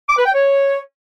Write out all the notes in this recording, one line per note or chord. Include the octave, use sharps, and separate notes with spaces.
D6
B4
G5
C#5